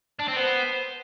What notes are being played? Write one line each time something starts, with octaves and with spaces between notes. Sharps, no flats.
D4
C4
B3 C5